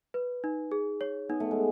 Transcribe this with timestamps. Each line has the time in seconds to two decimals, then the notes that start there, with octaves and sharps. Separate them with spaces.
0.14 B4
0.44 D#4
0.72 G#4
1.01 C#5
1.29 B3 D#4
1.40 A3
1.51 G#3